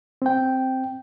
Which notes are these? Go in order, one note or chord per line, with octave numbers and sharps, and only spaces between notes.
C4 G5